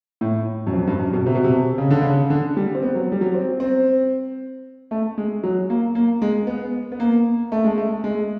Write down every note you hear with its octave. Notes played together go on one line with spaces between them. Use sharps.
A2
F#2
F2
G2
F#2
B2
C3
B2
C3
C#3
D3
C#3
D3
G3
C4
B3
F#3
G3
F#3
C4
C4
A3
G#3
F#3
A#3
A#3
G#3
B3
B3
A#3
A3
G#3
A3
G#3